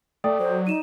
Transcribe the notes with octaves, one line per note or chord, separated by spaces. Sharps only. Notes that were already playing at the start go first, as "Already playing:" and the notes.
A3 A4 D5 G5 D#6
F#3 C5
D#4 D#7 E7